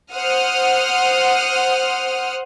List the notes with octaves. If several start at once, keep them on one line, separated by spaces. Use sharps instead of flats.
C5 F#5 D#6 F6